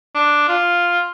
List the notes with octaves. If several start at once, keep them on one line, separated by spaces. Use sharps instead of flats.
D4
F4